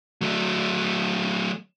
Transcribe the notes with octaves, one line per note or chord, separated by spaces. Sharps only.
F#3 A3